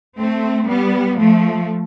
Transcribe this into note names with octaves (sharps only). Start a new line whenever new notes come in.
A3 C4
G3 B3
F3 A3